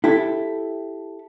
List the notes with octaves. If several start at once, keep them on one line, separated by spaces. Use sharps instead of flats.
E4 G4 A4